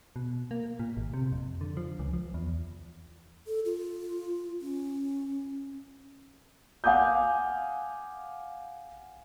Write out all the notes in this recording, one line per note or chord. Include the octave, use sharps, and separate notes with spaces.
B2
A#3
A#2
G#1
C3
F2
D3
F3
C#2
F3
E2
A4
F4
C#4
F5 F#5 G#5 D6 D#6 G6